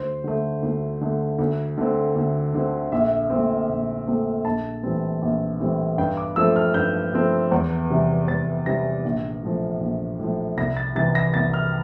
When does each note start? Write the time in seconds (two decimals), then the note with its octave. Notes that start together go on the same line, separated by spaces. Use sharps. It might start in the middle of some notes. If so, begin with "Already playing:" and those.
Already playing: D2 C5
0.24 D3 A3
0.63 D2
1.01 D3 A3
1.39 D2
1.78 D3 A3 C4
2.15 D2
2.54 D3 A3 C4
2.92 A#1 E5
3.30 A#2 A3 C4
3.69 A#1
4.07 A#2 A3 C4
4.45 A#1 A5
4.83 A2 E3 G3 C4
5.22 A#1
5.60 A2 E3 G3 C4
5.98 G2 G5
6.17 D6
6.36 F3 A3 C4 E6
6.56 F6
6.74 G2 G6
7.13 F3 A3 C4
7.52 E2
7.90 C3 E3 G3
8.28 E2 A6
8.66 C3 E3 G3 A#6
9.05 A#1
9.43 A2 F3
9.81 A#1
10.19 A2 F3
10.57 C2 A#6
10.77 A6
10.95 C3 E3 A6
11.15 A#6
11.34 C2 A6
11.54 F6